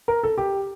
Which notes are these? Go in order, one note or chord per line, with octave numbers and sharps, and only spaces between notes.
A#4
A4
G4